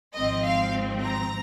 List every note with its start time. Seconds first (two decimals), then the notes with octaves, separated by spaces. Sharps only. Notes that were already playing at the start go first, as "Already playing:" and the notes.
0.16 G#1 G#2 F3 C4 D#5
0.45 F5
1.05 A#5